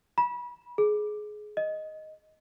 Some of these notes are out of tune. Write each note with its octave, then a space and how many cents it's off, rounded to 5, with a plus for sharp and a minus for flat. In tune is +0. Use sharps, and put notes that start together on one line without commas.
B5 -30
G#4 +20
D#5 +5